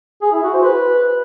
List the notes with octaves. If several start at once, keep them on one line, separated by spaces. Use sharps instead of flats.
G#4
E4
F#4
C5
B4